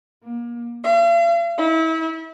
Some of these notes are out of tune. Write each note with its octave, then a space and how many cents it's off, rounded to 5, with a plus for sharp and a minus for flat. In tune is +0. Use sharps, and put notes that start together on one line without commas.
A#3 +30
F5 -45
E4 -30